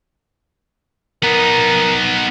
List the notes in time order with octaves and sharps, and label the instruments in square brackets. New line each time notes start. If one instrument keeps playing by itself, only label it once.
[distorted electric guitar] B3 D#4 [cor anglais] A#4